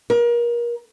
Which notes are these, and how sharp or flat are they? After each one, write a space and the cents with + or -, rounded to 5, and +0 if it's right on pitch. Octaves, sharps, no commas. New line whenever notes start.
A#4 +30